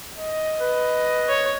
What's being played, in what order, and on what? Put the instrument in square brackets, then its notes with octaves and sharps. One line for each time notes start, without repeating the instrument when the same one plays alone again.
[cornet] D#5
[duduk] B4
[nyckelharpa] C#5